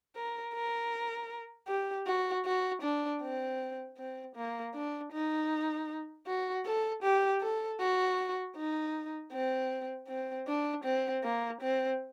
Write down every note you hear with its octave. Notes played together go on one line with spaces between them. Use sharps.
A#4
A#4
G4
F#4
F#4
D4
C4
C4
A#3
D4
D#4
F#4
A4
G4
A4
F#4
D#4
C4
C4
D4
C4
A#3
C4